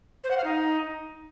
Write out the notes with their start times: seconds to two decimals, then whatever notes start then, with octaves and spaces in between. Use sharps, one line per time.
0.24 C5
0.31 F#5
0.37 F5
0.44 D#4